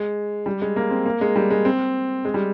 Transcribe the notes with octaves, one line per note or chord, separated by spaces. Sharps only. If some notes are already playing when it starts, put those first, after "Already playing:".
Already playing: G#3
G3
G#3
A#3
C4
A#3
G#3
G3
G#3
C4
G#3
G3